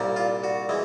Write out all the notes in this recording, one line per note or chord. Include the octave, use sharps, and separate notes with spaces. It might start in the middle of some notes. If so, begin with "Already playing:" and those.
Already playing: C2 A#2 G3
F4
F#4
E3 G#3